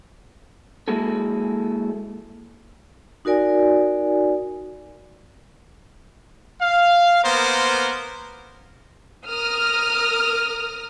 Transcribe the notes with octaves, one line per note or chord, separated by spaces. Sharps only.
G#3 A#3 E4 F#4 G#4 A4
D#4 F#4 A#4 D5 G#5
F5
A#3 B3 A#4 C5
A#4 D#6 F6